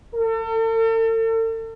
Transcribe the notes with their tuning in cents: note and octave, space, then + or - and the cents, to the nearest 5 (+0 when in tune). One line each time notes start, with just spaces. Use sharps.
A4 +40